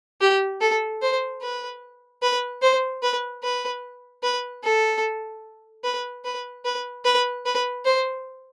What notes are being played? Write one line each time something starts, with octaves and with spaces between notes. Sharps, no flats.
G4
A4
C5
B4
B4
C5
B4
B4
B4
A4
B4
B4
B4
B4
B4
C5